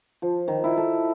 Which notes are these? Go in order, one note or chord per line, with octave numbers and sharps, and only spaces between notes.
F3
D#3
E4
A4